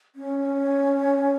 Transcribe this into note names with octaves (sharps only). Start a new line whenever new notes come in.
C#4